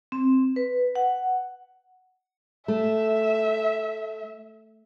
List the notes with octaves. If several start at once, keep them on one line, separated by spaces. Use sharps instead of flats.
C4
B4
F#5
A3 E5